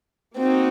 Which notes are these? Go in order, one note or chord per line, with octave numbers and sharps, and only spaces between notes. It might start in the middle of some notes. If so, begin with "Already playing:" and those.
A#3 C4 D#4 F#4